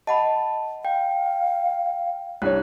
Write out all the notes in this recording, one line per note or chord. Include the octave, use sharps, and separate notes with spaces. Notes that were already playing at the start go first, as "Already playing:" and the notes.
D#5 F#5 A5 B5
F5 G5
C2 D4 C#5 F#6